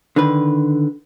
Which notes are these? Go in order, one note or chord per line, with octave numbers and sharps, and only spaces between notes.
D3 D#3 B4